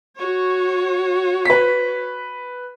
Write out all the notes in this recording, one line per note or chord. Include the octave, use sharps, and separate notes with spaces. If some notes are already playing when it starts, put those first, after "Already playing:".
F#4 C#5
B4 B6